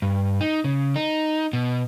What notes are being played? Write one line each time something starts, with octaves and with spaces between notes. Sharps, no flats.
G2
D#4
C#3
D#4
B2